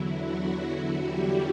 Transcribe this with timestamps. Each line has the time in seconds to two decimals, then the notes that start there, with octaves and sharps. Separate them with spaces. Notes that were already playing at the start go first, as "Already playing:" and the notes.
Already playing: E2 D3 F#3 E4
0.15 F#4
0.71 F#4
1.00 G3 G4